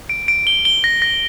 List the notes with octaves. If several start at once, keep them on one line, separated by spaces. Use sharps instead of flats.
D7
D7
G7
G7
A#6
A#6